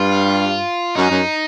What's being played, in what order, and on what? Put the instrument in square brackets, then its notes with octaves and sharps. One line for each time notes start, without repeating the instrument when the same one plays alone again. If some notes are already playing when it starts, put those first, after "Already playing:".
Already playing: [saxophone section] G2 [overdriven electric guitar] F4
[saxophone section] F#2 [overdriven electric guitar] D#4
[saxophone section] F#2